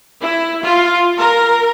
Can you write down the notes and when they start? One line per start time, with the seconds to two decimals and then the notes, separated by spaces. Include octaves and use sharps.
0.23 E4
0.62 F4
1.17 A#4